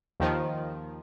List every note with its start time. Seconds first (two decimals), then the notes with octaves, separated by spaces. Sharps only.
0.20 D#2 D#3 F3